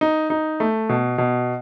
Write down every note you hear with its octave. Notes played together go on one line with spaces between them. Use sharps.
D#4
D#4
A3
B2
B2